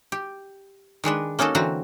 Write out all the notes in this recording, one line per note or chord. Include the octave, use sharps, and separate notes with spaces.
G4
D#3 G#3 D4 B4
A#3 C#4 D#4 F#4 A4
D3 E3 F#3 C4 F#4 A#5